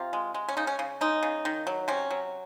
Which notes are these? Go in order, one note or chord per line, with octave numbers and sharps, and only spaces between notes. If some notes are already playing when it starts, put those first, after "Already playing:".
Already playing: C3 F4
G#3
G#3
C#4
C#3 D#4
C#4
C#3
G#3 D#4
C#3
D#3
F#3
C3 C#4
F#3